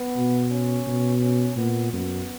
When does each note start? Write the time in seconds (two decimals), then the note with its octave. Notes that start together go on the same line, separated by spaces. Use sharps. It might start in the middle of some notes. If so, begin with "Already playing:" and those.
Already playing: B3
0.16 B2
0.51 C#4
0.87 B2
1.22 C#4
1.56 A#2 B3
1.91 F#2 B3